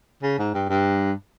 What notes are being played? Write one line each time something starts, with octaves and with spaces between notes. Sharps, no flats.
C#3
G#2
G2
G2